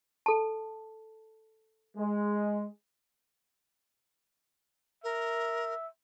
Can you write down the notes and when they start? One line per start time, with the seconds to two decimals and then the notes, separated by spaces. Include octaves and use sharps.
0.26 A4 A5
1.97 G#3
5.04 A#4 E5